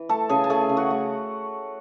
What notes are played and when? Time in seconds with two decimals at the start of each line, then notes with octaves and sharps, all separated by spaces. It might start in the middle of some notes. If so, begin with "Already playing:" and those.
Already playing: E3
0.09 A3 A4 A5
0.29 C#3 G#4 G#5
0.44 A5
0.50 A3 G#4 G#5
0.69 C#3
0.77 F#4 F#5
0.90 A3